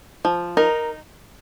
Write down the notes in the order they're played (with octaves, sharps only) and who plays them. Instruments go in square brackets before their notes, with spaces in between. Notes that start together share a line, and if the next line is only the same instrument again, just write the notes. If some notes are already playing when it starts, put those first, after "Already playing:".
[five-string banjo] F3
[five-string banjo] D#4 [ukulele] A#4